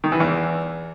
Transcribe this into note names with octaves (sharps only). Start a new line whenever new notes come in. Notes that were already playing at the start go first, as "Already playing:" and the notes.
D#3
E3
E2